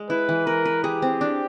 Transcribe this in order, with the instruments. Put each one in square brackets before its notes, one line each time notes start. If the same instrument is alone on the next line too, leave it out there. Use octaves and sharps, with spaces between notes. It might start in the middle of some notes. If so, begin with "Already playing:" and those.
Already playing: [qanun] G#3
[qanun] E4 [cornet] B4
[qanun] E3
[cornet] A#4 [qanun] B4
[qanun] B4
[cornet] G4 [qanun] G#4
[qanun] C4
D4